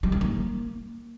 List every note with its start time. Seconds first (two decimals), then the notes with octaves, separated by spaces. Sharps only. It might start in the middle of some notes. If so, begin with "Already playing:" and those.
0.03 G3
0.12 D#3
0.21 A#3